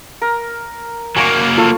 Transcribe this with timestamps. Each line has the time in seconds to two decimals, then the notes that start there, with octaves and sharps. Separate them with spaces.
0.22 A#4
1.16 F#3 A#3 G#5 A#5 C#6
1.58 F4 A4 C#6